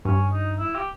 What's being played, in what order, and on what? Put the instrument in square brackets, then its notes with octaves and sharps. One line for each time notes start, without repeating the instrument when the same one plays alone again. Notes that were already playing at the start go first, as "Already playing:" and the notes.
[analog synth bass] G2 [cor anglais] C#4
[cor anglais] D#4
E4
G4